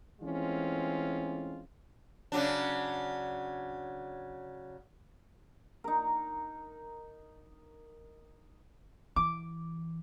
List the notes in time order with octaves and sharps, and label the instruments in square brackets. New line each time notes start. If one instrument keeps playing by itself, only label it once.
[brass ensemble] E3 G#3 A3 C4 C#4 F4
[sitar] C#3 F#3 D4
[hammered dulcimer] D#4 A#4
[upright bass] E3 [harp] D6